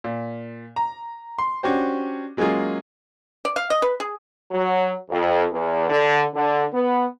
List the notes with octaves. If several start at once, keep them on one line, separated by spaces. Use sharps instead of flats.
A#2
A#5
C6
C#4 D4 F#4 G4 C5
F#3 G#3 A#3 C#4 F4 G#4
D5
F5
D#5
B4
G#4
F#3
F2
E2
D3
D3
B3